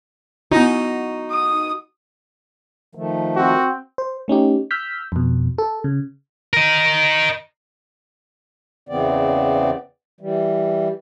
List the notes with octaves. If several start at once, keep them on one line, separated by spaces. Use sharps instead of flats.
B3 D#4 E4 F#4
D#6
D#3 F3 A3
C4 F#4
C5
A3 C#4 D#4 G4
E6 F6 G6 B6
F2 B2
A4
C#3
A#4 D#5
E2 C#3 E3 B3 C4 D5
E3 G3